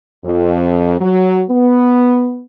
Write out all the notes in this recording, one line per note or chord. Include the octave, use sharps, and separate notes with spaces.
F2
F#3
B3